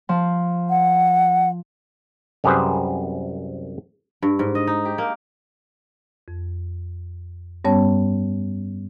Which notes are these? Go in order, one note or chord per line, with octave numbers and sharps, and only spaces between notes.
F3
F#5
C2 F#2 G4 G#4 B4 C5
G2
G#2
D#5
D#4
G4
A#3
F2
G2 G3 B3 C#4 C#5 A5